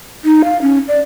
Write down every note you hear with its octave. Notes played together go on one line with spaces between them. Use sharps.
D#4
F5
C#4
D5